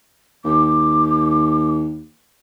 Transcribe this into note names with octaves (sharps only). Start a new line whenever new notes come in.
D#2 D6